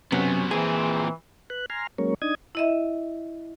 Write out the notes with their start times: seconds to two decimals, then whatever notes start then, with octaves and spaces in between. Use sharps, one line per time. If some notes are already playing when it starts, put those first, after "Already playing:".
0.12 F#2 C3 F#3 B3 C#4
0.51 A#2 E3 C4 G#4
1.50 B4 F#6
1.70 G#5 A#5 C6 F6
1.98 F#3 G#3 A#3 C#4 A#4 C#5
2.22 D4 D#4 D#6 G#6
2.55 E4 D#5 E5